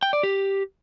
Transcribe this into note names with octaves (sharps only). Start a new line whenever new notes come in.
G5
D5
G4